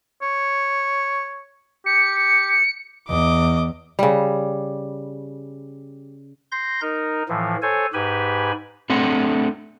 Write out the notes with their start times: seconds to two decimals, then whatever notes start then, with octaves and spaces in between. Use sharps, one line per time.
0.22 C#5
1.86 G4 C#7
3.08 E2 D#5 D6
3.99 C#3 G3
6.52 C6 G6 A#6
6.81 D#4 A#4
7.29 A2 E3 F3
7.62 A4 C5 C#5 G#5
7.93 G#2 G4 B4 G#5 B5
8.90 A3 C4 D4 F#5